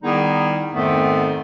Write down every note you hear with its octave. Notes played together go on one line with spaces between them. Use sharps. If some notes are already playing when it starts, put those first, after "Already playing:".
D#3 G3 B3 D#4 E4 G#4
F2 G#2 D#3 A3 B3 C4